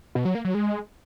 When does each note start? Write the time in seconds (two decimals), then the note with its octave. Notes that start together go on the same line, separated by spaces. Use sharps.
0.15 B2
0.25 F#3
0.35 A#3
0.45 F#3
0.54 G#3